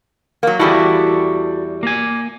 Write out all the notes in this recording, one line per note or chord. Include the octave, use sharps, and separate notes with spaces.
F#3 A#3
E2 G3 E4 F#4 A4
A#3 G#5